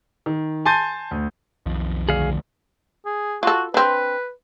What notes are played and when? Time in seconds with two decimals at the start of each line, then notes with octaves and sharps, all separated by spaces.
0.26 D#3
0.66 G#5 A5 C6 G6 A6 D#7
1.11 D2
1.66 B1 F2 D#3 F3
2.09 D2 G#4 F5
3.06 G#4
3.43 F4 F#4 A4
3.74 C4 D4 B4